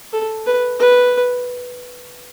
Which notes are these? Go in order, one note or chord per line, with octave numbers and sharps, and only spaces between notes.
A4
B4
B4